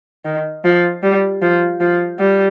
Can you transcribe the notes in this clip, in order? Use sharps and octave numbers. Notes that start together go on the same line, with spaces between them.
D#3
F3
G3
F3
F3
G3